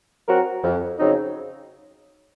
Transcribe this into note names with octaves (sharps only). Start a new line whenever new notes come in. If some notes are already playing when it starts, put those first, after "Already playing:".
F#3 C4 F#4 A#4
F2
C#3 F#3 C4 D#4